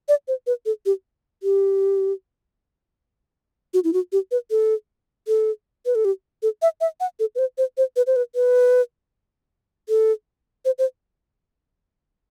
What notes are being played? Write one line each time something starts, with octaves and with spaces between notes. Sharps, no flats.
D5
C5
B4
A4
G4
G4
F#4
E4
F#4
G4
B4
A4
A4
B4
A4
G4
A4
E5
E5
F#5
A4
B4
C5
C5
C5
B4
C5
B4
B4
A4
C5
C5